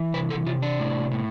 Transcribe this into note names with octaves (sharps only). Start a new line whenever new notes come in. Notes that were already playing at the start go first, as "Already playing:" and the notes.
Already playing: E3
C3 B4
A4
C3 F4
D4
A2
A2